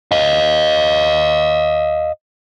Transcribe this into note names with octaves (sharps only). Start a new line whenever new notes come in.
D#5 F5